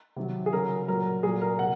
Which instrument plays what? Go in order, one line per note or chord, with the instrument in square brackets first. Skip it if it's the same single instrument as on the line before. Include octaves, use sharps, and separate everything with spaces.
[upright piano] C3 D#3 F#3
G#4
C#3 F#3 A#4
A#2 F#3 A#4
A#2 F#3 G#4
A#4
C3 F#5